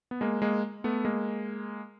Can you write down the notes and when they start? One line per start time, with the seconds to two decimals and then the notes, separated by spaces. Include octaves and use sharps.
0.11 B3
0.21 G#3 A#3
0.42 G#3 A#3
0.84 A3 B3
1.05 G#3 A#3